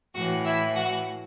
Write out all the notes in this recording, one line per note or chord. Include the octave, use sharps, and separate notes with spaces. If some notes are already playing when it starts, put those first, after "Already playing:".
A2 E3 F#4 F#5
E4 E5
F#4 F#5